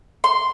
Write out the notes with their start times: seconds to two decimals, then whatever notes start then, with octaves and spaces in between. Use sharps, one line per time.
0.24 C6